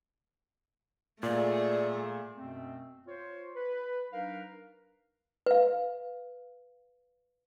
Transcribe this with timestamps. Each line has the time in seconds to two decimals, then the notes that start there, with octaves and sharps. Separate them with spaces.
1.23 A#2 A3 G#4 D5
2.36 F#2 B2 A3 B3 C4
3.07 F4 C5 C#5
3.56 B4
4.12 F#3 D4 D#4 A#4 B4 F5
5.46 B4 F5